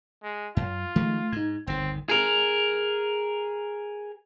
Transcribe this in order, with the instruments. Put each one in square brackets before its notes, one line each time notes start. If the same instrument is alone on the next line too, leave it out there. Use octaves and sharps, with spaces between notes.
[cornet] G#3
[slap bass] F#2 [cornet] F4
[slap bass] D#3 F3 G#3 [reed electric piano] A3
[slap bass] G#2 [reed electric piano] D#4 G#6
[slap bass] G1 D#3 [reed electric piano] D2 [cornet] C4
[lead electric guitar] G#4 A#4